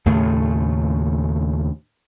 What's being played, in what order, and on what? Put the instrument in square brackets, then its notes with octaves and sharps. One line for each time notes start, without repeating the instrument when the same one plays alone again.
[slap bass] D#2 A2 C#3 A3